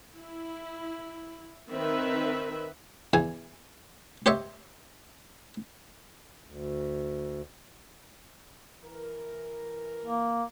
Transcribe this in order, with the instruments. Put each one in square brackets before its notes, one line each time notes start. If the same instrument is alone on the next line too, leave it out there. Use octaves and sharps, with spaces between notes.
[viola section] E4
D#3 C4 B4 E5
[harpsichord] E2 G#5
G4 C5 C#5 D#5 E5
[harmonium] D2
[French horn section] E3 A#4
[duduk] A#3